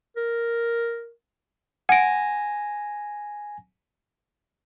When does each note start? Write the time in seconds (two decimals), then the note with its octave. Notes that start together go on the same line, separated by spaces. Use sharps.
0.16 A#4
1.89 F#5 G#5 A#6 D7